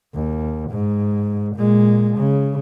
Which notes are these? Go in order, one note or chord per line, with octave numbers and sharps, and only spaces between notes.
D#2
G#2
A#2 G#3
C#3